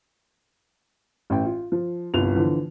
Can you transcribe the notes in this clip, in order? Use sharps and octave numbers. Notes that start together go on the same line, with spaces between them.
A1 G5
F4
F3
G1 C2 F4 F7
D3 E3 F3